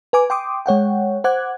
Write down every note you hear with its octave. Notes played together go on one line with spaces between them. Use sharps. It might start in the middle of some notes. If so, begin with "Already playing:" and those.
B4 G#5 D6
G5 C6 D6 D#6
G#3 C#5 F#5 G5
C5 F#5 D6 F#6 G#6